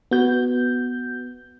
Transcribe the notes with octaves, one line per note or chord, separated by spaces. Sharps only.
B3 F#4 G6